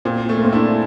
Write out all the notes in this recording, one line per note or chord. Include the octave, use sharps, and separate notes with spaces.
A#2 C4
A3
A#3
C4
D4 E4